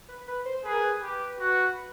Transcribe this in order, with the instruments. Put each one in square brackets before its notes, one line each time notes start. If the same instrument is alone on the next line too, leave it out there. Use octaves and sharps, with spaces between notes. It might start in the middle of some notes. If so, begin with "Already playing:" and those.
[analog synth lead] B4
B4
C5
[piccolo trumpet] G#4 [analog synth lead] B4
[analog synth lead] A#4
B4
[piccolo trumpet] G4
F#4